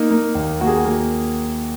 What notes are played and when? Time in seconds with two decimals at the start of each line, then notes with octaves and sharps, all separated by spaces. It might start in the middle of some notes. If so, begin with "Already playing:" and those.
Already playing: A#3 D#4
0.11 A#3
0.35 D#2
0.61 A#3 F#4
0.67 G#4
0.76 F#4
0.85 A#3